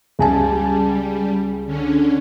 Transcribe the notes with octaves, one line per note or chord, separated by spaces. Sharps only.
C#2 G3 G#5 A5
D3 C#4